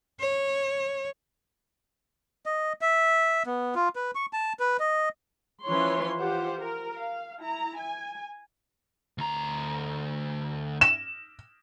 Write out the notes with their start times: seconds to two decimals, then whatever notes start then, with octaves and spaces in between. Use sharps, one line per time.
0.20 C#5
2.46 D#5
2.81 E5
3.46 B3
3.75 F4
3.96 B4
4.15 C#6
4.33 A5
4.59 B4
4.80 D#5
5.66 E3 F3 C#4 B4 C#5 C6
6.19 F4 G4 C5 F#5
6.61 A#4
6.99 F5
7.39 E4 A#5
7.79 G#5
9.18 D2 A#5
10.81 E7